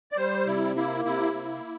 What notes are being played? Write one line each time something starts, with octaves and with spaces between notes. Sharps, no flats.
D5
G3 C5
C3 E4
A#3 E4
C3 E4
A#3